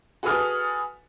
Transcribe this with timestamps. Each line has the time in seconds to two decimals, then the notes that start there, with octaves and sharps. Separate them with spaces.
0.23 F#4 G#4 A4 B4 D#6 F6